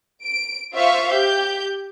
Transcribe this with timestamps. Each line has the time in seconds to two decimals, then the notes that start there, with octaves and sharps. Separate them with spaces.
0.23 D7
0.73 F4 C5 E5 F5 C#6
1.12 G4 G6